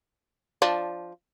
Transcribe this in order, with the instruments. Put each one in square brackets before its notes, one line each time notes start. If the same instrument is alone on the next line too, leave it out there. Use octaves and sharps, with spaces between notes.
[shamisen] F3 D4